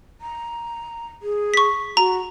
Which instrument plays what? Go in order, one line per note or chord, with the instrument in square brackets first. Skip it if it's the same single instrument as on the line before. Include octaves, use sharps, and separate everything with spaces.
[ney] A#5
G#4
[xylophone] C#6 B6
[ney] F#4 [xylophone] A#5